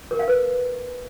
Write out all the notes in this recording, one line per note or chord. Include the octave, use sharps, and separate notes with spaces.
A#4
F5
B4